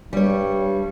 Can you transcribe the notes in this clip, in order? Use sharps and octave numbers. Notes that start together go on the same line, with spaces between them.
G2 G3 C#5